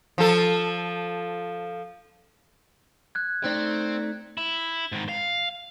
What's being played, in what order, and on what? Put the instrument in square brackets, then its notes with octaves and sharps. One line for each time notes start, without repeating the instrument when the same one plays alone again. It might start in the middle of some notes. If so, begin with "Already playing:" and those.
[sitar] F3 A4
[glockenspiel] F#6 G#6
[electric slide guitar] A3 D#4 D5 [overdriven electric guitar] C4
[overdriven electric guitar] E4
G#2 D#3
F5